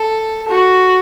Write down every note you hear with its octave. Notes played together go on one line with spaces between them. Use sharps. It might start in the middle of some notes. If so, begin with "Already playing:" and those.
Already playing: A4
F#4